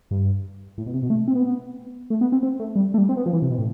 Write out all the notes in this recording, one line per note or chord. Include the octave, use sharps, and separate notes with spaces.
G2
A2
B2
C3
B2
A3
C4
B3
A3
B3
C4
C4
A3
G3
A3
G3
C4
B3
F3
E3
C3
B2
A2